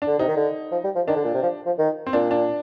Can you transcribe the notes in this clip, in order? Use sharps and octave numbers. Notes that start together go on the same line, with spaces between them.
D4
D3
C3 D#4
D#3
D3
F3
G3
F3
D#3 D4
D3
A#2
C3
F3
F3
D#3
C4
A#2 D4
D4